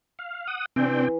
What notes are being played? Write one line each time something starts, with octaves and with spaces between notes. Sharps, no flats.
F5
F#5 D#6
C3 E3 C4 D4 G5